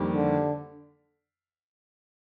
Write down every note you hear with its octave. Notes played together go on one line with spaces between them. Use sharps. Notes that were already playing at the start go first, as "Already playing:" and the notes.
Already playing: F2 D#3 G3 A#3 D4
D3